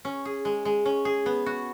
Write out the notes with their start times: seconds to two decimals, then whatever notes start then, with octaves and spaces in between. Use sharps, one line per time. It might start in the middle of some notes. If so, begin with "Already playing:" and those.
0.05 C#4
0.25 G#4
0.45 G#3
0.65 G#3
0.85 C#4
1.05 G#4
1.26 B3
1.46 F#4